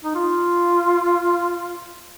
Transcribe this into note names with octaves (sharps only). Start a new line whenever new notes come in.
D#4
F4